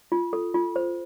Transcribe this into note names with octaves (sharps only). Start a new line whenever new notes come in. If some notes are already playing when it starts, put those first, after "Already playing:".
F4
A4
F4
C5